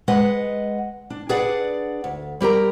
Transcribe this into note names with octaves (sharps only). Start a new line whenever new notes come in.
G#3 B4 D#5 F#5
D4
D4 G#4 B4 D5 F#5
D2
G3 G4 A#4 A#5